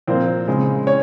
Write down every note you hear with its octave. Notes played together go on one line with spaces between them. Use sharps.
A#2 F3 A#3 C4 C5
C#3 G#3 C4
C#4 C#5